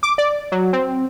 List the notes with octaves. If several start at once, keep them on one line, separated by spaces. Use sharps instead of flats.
D6
D5
F#3
C4